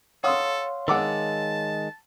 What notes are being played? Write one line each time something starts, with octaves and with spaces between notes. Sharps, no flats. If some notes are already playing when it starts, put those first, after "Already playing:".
A4 C#5 F5 F#5 C6 D#6 E6
D#3 G#3 F#5 A5 D6 E6